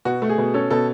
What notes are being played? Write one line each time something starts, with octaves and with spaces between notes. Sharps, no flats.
B2 F#4
A3
G#4
B2
C#4 A4
B2 A4